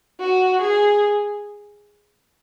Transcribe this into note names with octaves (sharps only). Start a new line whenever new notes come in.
F#4
G#4